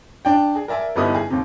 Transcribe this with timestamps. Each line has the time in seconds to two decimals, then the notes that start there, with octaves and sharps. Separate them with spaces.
0.25 D4 G5
0.55 G#4
0.68 A#4 D5 E5 G#5
0.96 G1 G3 B3 D#4 E4 D#6
1.15 G#4
1.30 D#2 C3